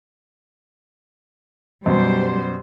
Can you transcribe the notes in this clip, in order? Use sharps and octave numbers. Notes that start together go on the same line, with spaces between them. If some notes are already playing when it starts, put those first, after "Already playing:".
F#2 B2 G3 C5